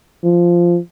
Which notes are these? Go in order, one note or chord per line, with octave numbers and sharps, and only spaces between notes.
F3